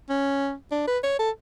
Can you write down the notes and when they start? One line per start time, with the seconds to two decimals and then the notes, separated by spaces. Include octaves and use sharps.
0.09 C#4
0.71 D4
0.87 B4
1.04 C#5
1.19 A4